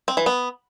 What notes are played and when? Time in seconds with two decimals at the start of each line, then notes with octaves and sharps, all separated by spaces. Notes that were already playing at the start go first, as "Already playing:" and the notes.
0.08 C4
0.17 E3
0.26 B3